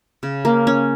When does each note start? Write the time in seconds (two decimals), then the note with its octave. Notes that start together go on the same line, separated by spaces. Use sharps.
0.23 C#3
0.45 A#3
0.67 C#4